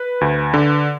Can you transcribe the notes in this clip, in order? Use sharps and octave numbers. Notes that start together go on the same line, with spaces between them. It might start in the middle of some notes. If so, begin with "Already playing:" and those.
Already playing: B4
D2
D3